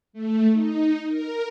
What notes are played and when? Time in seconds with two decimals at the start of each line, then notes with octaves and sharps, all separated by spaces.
0.13 A3
0.53 D#4
1.08 A#4